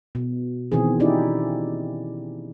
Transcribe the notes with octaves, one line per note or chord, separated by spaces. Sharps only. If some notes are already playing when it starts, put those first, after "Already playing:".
B2
B2 D#3 E3 C4 G#4
C#4 D#4 E4 G4 D5